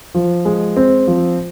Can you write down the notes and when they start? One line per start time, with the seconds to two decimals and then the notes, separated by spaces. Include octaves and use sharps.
0.14 F3
0.45 G#3
0.77 C4
1.07 F3